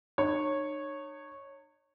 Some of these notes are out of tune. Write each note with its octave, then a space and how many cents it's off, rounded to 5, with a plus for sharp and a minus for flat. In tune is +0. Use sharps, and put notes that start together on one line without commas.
D#4 -45 C#5 -10